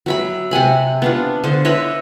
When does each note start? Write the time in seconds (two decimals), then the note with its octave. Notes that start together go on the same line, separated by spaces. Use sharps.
0.06 F#3 E5 B5
0.51 C3 F#5 G#5 B5
1.02 B3 D4 F4
1.44 D3 C5
1.65 B4 C#5 D#5 E5